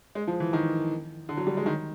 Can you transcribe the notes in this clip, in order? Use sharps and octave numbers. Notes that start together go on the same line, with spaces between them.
G#3
F3
E3
D#3
D3
F#3
G3
G#3
D#3